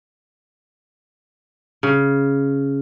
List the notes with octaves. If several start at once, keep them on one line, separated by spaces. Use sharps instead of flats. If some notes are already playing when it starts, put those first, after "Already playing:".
C#3